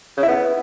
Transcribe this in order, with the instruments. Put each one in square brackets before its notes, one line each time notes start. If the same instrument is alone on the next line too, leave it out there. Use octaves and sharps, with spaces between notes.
[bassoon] C#3
E4
B3